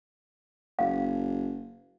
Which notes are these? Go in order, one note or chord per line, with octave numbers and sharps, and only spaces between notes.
F#1 F5